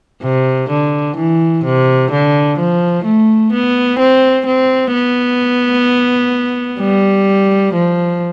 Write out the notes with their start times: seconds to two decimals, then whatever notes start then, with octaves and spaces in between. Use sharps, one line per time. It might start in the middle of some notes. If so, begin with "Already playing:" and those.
0.23 C3
0.70 D3
1.17 E3
1.65 C3
2.11 D3
2.58 F3
3.05 A3
3.53 B3
3.99 C4
4.46 C4
4.93 B3
6.80 G3
7.74 F3